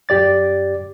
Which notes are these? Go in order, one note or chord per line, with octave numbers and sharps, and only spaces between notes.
F#2 G4 D5 A6